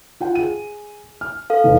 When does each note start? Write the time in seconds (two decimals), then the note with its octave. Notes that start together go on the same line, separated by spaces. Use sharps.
0.20 F4 F#5 G5
0.35 G#4 D#7
1.21 F6
1.50 A4 F5
1.64 F1 E2 B2